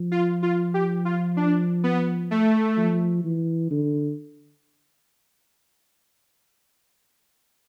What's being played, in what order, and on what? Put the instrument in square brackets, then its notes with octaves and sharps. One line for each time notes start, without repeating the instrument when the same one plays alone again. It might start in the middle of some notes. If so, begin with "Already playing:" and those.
Already playing: [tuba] F3
[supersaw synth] F4
F4
G4
F4
D4
B3
A3
[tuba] F3
E3
D3